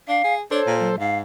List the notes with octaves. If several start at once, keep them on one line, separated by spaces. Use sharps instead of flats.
D4 F5
G#4
D4 A4 C5 C#5
A#2
F#3
G#2 F5